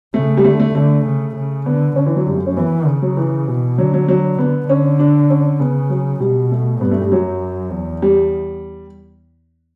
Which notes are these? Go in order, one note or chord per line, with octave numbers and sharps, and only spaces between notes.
C#3 A3
G3
D3 A3
A3
D3 A3
C#3
C#3
D3 B3
D3 C#4
E3
F#3
F#2 G3
A3
C#4
E3 B3
C#3
F#3
E3
B2
D3 F#3
F#3
F#3
D3 B3
D3 C#4
D4
C#4
C#3 B3
F#3
B2 G3
A3
G2 B3
A3
G3
F#2 F#3
E2
G3